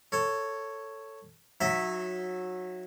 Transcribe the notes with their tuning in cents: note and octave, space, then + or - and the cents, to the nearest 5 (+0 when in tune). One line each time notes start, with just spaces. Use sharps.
A4 +15 C#5 +0
F#3 -20 D#4 +0 E5 -5